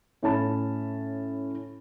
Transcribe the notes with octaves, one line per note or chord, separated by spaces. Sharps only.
A2 C#4 A5 B5